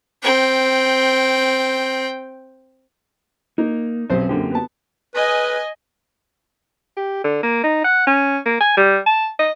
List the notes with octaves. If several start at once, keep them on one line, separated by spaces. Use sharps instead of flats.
C4 G5
A#3 D#4
B1 C4 C#4 G4 C5
F#2 D3 A#3 C4 G4
B3 A5
B4 D#5 G#5
G4
D3
A#3
D#4
F#5
C#4
A#3
G#5
G3
A5
D#5